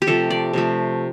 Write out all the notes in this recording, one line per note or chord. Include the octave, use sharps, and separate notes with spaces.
G4
C3 F3 A3 A4
D5
C3 F3 A3